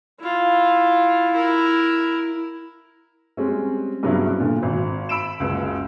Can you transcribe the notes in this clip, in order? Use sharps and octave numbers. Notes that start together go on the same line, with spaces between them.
E4 F4
E4 A#4
G3 G#3 C4 C#4
G2 C#3 F#3 B3 C4 E4
A#2 D3
G#1
B5 E6 D7 E7
F#1 C#2